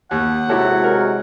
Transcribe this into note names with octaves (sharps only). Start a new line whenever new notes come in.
D#2 F#5
C3 F#3 G#3 E4 G4 A4
A#4